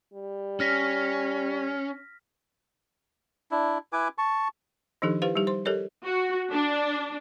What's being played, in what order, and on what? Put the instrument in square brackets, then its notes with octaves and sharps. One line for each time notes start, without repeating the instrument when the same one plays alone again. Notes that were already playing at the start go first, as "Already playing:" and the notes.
[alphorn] G3
[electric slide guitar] C#4 [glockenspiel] F6 A#6 B6
[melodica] D4 E4
E4 B4 G#5 D6
A5 C#6
[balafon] D#3 F3 D4 D#4 G4 A4
E4 G4 B4 C5 F5
G3 D#4 G4
C5 C6
G4 A4 A#4 C#5 D#5
[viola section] F#4
D4